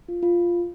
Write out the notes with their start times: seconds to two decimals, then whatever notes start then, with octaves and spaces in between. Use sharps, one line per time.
0.09 F4
0.23 F4